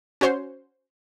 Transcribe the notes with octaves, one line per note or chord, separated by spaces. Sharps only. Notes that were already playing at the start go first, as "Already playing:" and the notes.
C#4 F#4 C5 C#5 C6